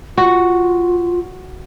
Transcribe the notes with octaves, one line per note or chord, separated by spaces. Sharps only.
F4 F#4